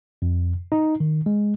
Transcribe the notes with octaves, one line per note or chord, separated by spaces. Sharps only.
F2
D#4
D#3
G#3